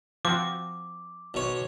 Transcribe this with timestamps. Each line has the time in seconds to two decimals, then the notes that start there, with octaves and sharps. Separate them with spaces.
0.25 F3 C4 F#4 D6
1.34 B1 C#5